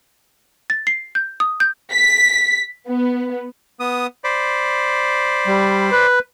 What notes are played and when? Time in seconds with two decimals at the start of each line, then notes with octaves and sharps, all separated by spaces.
0.70 A6
0.87 C7
1.15 G6
1.40 D#6
1.60 G6
1.92 B6
2.87 B3
3.80 B3 D#6
4.24 C5 D5 B5
5.47 G3
5.92 B4